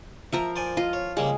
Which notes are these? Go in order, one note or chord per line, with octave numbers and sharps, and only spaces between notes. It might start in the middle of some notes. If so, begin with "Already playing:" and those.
F3 A#4 E5 A#5
C5 D5 G#5
F4 D#5
C#5
C#3 G3 G#3 A#3